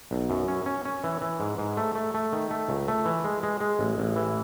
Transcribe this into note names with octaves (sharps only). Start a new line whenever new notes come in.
B1
F#2
C#4
C#4
C#4
E3
E3
G#2
G#2
A3
A3
A3
D#3
A3
C#2
A3
E3
G#3
G#3
G#3
A1
A1
E3